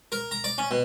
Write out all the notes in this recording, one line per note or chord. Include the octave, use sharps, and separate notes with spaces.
A#4
A#5
D5
C#4
B2